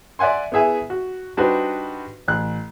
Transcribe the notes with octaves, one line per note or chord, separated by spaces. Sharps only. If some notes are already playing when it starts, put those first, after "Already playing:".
D5 E5 F#5 G#5 C6
B3 E4 G#4 E5 G#5
F#4
G3 D4 D#4 F#4 B4 C5
A1 F#6